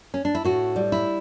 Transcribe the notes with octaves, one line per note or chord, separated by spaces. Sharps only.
C#4
D4
E4
A2 F#4
G3
E4